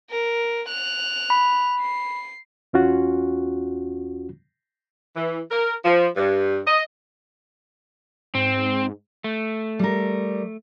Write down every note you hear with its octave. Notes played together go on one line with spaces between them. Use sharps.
A#4
F#6 F7
B5
C7
E2 C#4 F4 F#4
E3
A#4
F3
G2
D#5
G#2 C4
A3
G3 A#4